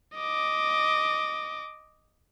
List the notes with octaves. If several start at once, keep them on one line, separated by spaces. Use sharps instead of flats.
D#5 D6